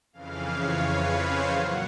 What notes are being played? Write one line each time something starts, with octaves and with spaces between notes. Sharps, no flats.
F2 C#3 E3 F5
C#5
B4
C5
A#2 F#3 F#5